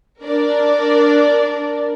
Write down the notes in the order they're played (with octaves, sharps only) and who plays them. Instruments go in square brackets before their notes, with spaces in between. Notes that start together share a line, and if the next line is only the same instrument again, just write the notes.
[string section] D4 A#4 D5